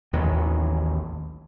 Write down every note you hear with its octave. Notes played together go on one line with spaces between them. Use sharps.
A1 D#2 D#3 F#3